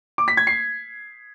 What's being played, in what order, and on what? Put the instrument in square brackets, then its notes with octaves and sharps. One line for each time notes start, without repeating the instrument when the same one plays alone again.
[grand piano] D6
B6
G#6
C7